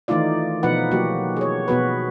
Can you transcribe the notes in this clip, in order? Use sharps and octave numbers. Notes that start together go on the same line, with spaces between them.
D#3 E3 A3 D#4 F4 D5
B2 F3 D#4 B4 F#5
F#3 A#3 F#4 G4
G#4 C#5
B2 B3 F#4 B4